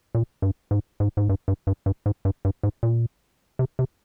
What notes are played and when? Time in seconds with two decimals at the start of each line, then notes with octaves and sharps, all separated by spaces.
0.15 A#2
0.42 G2
0.71 G#2
1.00 G#2
1.17 G#2
1.29 G2
1.48 G2
1.67 G2
1.86 G2
2.06 G#2
2.25 G2
2.45 G2
2.63 G#2
2.83 A#2
3.59 C3
3.79 C3